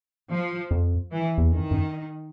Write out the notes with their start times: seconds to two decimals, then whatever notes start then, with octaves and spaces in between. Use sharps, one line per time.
0.31 F3
0.71 F2
1.12 E3
1.38 E2
1.51 F2 D#3
1.71 F#2